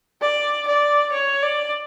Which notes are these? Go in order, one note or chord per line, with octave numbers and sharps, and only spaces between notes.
D5
D5
C#5
D5